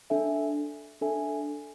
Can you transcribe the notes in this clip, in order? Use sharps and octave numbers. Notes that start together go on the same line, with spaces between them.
D4 A4 E5 G#5
D4 A4 E5 G#5